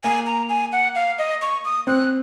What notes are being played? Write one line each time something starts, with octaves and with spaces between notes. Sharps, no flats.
A#3 G#5
A#5
G#5
F#5
F5
D#5
C#6
D#6
C4 F#6